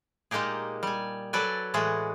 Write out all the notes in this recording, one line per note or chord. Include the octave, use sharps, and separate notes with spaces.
A#2 G#3 A#3 D#4 G4 G#4
G3 G#5
F#3 A4 B4 D5 G#5
A2 E3 G#3 F#4 G#4